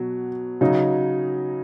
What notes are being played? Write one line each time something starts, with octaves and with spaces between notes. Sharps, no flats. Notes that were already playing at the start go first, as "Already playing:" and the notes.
Already playing: B2 F#3
C#3 F#3 D#4